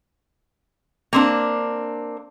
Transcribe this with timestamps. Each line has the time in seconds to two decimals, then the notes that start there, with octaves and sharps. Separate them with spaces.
1.13 A#3 C4 D4